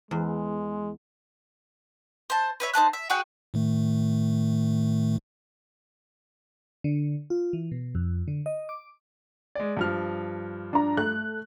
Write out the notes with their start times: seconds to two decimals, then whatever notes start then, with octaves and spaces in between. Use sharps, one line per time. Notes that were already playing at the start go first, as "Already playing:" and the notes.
0.11 E2 G#3
2.30 C5 A5
2.60 B4 C#5 E5
2.73 D#4 C5 A5 F#6
2.93 E5
3.10 F#4 G#4 F#5 G5
3.54 A2 D#3 A3
6.84 D3
7.30 F4
7.53 E3
7.72 B2
7.95 F2
8.28 D3
8.46 D#5
8.69 D6
9.55 G#3 D5
9.77 G2 F3 F6
10.73 D4 A#5
10.97 A3 F#6